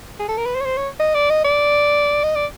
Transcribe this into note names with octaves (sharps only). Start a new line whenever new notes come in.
G#4
A4
A#4
B4
C5
C#5
C5
C#5
D#5
D5
D#5
D5
D#5
D5